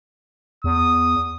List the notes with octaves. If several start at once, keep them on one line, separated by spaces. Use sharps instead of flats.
E2 D#6